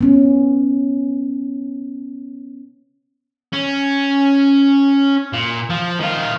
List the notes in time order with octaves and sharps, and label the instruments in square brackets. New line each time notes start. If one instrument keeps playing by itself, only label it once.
[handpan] B3 C#4
[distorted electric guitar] C#4
A#2
F3
D#3 F4